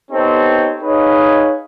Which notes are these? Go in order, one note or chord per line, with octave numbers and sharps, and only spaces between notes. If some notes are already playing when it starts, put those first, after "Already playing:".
B3 C4 D#4 G4 A4 C#5
D#4 G#4 B4 C#5 D#5 F5